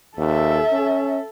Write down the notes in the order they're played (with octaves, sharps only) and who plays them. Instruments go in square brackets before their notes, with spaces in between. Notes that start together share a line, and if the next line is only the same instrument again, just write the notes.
[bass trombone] D#2 [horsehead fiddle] A4 E5
[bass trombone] C#4